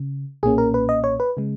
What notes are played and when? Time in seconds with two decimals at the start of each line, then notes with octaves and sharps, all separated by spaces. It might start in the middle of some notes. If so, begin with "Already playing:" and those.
Already playing: C#3
0.43 B1 A#2 A#3 C#4 G#4
0.58 A#4
0.74 B4
0.89 D#5
1.04 C#5
1.20 B4
1.37 C#3 G#3